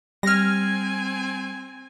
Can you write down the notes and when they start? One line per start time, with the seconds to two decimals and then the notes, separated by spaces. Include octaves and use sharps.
0.23 G3 C4 G#5 F6 A#6